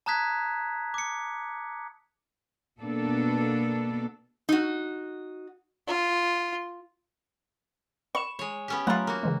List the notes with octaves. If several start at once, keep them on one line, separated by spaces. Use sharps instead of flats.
A5 A#5 D#6 F#6 G#6 B6
D6 C#7
B2 A#3 B3 D4 A4
D#4 F#4
F4
B5 C#6 E7
G#3 C#5
B3 C#4 G4
F#3 A3 F4 F#5 A#5
A#3 F#4
C#3 E3 G#3